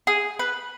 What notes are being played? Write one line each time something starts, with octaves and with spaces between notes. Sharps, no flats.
G#4
B4